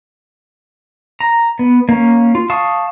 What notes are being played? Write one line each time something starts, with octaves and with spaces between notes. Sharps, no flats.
A#5
B3
A#3 C#4
F4
F5 A5 C#6 D#6